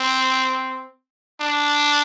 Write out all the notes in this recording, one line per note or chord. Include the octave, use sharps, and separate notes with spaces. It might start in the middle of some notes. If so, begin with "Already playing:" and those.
Already playing: C4
D4